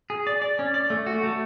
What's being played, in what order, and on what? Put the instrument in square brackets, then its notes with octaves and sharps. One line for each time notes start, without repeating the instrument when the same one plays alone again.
[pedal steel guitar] G#4
D5
D5
C#4
D5
A3
F#4
A3